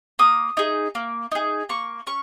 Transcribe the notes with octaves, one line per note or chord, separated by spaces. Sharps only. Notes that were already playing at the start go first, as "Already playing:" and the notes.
A#3 D#6
D#4 G#4
A#3
D#4 G#4
A#3 C#6
C#4 C#6